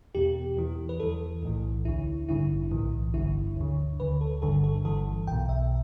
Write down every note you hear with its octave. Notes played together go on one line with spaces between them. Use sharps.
E2 B2 G4
E2 E3
B4
E2 E3 A4
B1 A2 E3
D2 D3 E4
A1 G2 D3 E4
B1 A2 E3
G1 G2 D3 E4
D2 D3
D2 D3 B4
A4
G1 G2 D3 A4
A4
G1 G2 E3 A4
B1 G5
B2
E5